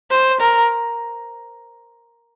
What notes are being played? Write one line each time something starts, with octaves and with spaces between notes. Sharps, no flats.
C5
A#4